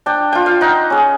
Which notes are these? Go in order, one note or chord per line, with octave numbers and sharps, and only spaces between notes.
D4 G5
F4 G5
F5
D#4 F#5
C#4 G#4